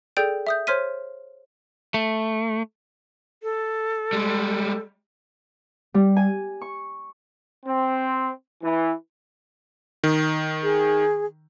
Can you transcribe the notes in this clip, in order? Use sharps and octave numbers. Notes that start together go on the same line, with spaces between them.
G#4 A4 D5 G5 G6 D7
E5 D#6 G6
C5 C#5 C6 F6 B6 D#7
A3
A4
G3 G#3
G3
G#5
C#6
C4
E3
D#3
G#4